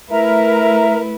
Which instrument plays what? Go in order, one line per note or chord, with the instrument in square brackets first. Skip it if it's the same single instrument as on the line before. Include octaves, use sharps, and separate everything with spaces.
[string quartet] A3 E4 B4 [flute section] A#4 E5 A#5